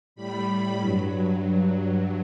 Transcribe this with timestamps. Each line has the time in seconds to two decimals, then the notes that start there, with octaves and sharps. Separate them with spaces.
0.15 A2 G3 B5
0.78 G2 F#3
1.40 G2 F#3